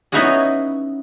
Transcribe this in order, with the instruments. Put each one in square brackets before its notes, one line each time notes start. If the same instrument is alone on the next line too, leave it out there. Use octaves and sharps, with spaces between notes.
[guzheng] B3 C#4 D#4 E4 F#4 G#4